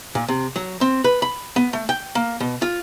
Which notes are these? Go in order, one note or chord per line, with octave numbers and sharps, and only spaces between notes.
A#2
C3
F#3
C4
B4
B5
B3
A3
G5
A#3
B2
F4